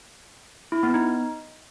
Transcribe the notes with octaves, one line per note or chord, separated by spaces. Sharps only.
E4
B3
D#4